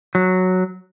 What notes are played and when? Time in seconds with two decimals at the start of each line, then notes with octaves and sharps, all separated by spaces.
0.15 F#3